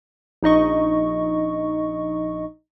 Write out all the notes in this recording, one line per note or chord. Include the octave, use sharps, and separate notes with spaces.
A#1 D#4 D#5 C#6